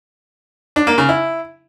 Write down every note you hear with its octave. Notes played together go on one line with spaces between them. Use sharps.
D4
A#3
C#3
E4